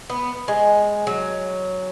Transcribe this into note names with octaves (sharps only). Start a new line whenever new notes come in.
B3
G#3
F#3